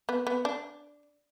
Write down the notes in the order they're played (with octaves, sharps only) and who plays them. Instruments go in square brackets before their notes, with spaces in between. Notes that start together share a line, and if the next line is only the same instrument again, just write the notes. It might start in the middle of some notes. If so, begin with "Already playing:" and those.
[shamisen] B3
B3
D4